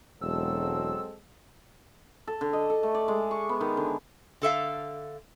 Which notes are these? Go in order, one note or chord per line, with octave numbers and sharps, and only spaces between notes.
E1 F#3 G#3 C4 A4 E6
A4
D3
D#5
A4
A3
D5
G#3
C#6
B3
D#3
D3
D3 A4 E5 F5